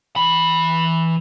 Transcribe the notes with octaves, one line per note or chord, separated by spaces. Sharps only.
E3 B5